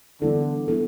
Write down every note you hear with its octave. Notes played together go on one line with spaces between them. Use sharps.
D3 E3 G3 B3 E4 A4
G3 B3 E4 A4